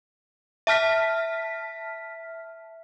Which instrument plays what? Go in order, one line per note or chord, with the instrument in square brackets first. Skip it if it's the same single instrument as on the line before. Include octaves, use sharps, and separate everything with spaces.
[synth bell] E5 A5 F6 B6